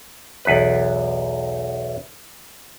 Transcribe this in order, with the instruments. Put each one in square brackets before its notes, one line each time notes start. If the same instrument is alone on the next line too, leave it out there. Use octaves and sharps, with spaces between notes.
[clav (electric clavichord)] B1 E2 B4